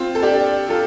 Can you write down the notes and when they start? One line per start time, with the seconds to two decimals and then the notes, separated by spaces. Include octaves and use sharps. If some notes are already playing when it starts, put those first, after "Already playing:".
Already playing: C4 F4
0.15 A4
0.22 D4 G4
0.69 F4 A4